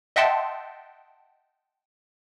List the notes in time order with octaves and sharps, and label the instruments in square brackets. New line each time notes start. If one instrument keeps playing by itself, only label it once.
[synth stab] D#5 E5 F#5 G5 A5 C6